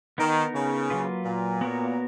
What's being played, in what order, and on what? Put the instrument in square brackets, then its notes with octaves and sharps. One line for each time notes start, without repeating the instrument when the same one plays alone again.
[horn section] D#3 [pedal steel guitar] B3 D#4 A#4
[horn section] C#3
[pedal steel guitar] F#3 A#3 F4 B4
[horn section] A#2
[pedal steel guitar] B3 F#4 A#4 C#5